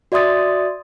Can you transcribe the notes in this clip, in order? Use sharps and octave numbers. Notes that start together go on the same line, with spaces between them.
F#4 D5 E5 C6 D#6 A6